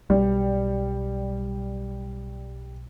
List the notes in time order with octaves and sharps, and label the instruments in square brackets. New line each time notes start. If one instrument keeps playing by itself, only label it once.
[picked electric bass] B1 [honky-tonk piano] G3